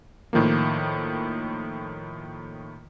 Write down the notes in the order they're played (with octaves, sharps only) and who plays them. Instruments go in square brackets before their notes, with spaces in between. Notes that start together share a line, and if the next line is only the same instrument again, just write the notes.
[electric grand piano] A2 D#3 F3 A#3